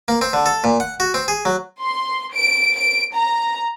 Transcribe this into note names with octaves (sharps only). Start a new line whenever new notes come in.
A#3
C4
D3
A4
A#2
F#5
F#4
C4
G#4
F#3
C6
D7
D7
A#5